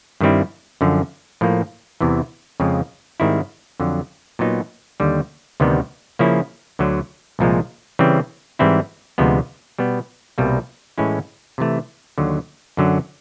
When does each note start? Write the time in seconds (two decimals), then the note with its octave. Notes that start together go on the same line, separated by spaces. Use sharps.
0.21 G2 D#3 G3 C4 E4
0.81 F#2 D3 F3
1.41 A2 F3 A#3
2.01 E2 C3 E3
2.60 F2 C#3 F3 G#3
3.20 G#2 D#3 G3 C4 E4
3.80 F2 D3 F#3
4.39 A#2 F#3 B3 D#4
5.00 D#2 D3 G3
5.60 D2 C3 D#3 G3 B3
6.19 C#3 F3 A#3 C#4 E4
6.79 D2 D3 F#3
7.39 C2 A#2 F3 G#3
7.99 C#3 E3 G3 C4
8.59 G#2 E3 G3 C4 E4
9.18 D2 C3 F3 G#3 B3
9.79 B2 G3 B3
10.38 C2 B2 G3 A#3
10.98 A2 E3 G#3 C#4 E4
11.58 C3 E3 A3
12.18 D#2 D3 F#3
12.77 F#2 D3 F#3